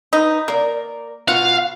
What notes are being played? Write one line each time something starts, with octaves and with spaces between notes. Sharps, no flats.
D#4 B4
A#3 A#4 D5
B2 F4 F5 F#5